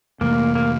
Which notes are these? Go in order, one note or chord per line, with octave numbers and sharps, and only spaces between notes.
F2 C3 E3 A3 A#3
A#3